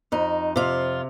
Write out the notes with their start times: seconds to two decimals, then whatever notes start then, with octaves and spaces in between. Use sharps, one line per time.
0.12 F2 D#4
0.56 C3 F4